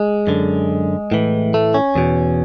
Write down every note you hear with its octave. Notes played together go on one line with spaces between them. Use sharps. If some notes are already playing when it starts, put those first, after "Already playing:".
Already playing: G#3
F#2 D3
A2 E3
A3
C#4
E2 B2